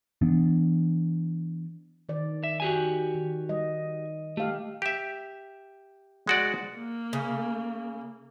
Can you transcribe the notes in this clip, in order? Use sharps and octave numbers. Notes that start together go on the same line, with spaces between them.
E3 B3 D4
D#3 D5
E5
F#4 G4 G#5
D#3
G3 D#5
A3 G4 F5
G4 E5
G#3 F#4 D5
A#3
C#3